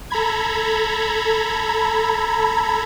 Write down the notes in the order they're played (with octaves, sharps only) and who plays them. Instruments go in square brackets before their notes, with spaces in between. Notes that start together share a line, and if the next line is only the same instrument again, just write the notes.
[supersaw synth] A4 A#5 B5 G#6